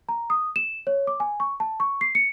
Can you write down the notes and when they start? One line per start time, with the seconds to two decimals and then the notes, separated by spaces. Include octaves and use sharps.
0.09 A#5
0.30 D#6
0.56 E7
0.87 C#5
1.07 D6
1.20 G#5
1.40 C#6
1.60 A5
1.80 C#6
2.01 C7
2.15 C#7